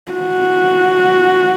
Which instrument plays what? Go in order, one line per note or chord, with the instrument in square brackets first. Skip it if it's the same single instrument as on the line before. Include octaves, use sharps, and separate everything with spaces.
[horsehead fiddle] F#4